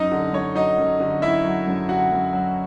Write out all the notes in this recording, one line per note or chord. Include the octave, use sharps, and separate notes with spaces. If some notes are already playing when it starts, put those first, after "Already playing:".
Already playing: F#2 D#4 D#5
D3
F#2 C#5
F#3 D#4 D#5
F#2
D3
F#2 E4 E5
F#3
F#2
D3 F#4 F#5
F#2
F#3